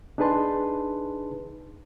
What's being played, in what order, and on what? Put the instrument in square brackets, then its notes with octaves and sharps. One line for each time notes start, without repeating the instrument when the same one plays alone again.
[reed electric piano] D4 D#4 G#4 B4 A5 C6